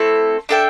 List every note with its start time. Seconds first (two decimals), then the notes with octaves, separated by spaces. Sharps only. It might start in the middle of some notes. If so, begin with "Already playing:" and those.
Already playing: A3 C4 E4 A4
0.49 D4 A4 E5 G5